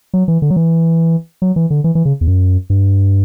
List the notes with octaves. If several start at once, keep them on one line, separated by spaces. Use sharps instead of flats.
F#3
E3
D3
F#3
E3
F#3
E3
D3
E3
E3
C#3
E2
F#2
G2